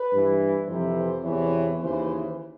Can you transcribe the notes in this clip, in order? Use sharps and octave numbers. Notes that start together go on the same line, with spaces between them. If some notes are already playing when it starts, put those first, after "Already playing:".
Already playing: B4
G2 E3
F2 C3 E3 C5
C5
E2 C3 E3 C#5
D#2 C#3 E3 C5